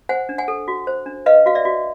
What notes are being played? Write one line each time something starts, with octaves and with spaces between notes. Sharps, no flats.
C5 F#5 G#5
D4
F#5 G#5
A4
F#4
C5
D4
B4 D#5 F5
F#4 F5
D5 E5
F#4